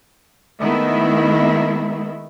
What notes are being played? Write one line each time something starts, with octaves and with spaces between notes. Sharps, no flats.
D#3 G#3 A3 B3 E4